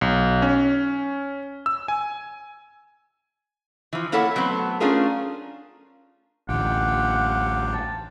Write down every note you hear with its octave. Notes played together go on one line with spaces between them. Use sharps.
B1
C#4
E6
G#5
E3 F3
A#3 E4 A4 C#5 F#5
F#3 A3 B3 C4
A3 C#4 D4 F4 G#4 A#4
A1 D2 F4 G4 F#5 G5
A5